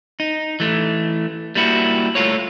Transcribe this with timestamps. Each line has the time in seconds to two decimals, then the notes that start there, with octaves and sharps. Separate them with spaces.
0.20 D#4
0.60 E3 A3
1.55 G3 A#3 E4 F#4
2.15 A3 F4 C#5